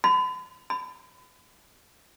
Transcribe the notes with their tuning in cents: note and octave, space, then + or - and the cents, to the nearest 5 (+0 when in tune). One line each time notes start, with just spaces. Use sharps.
B5 +45
B5 +35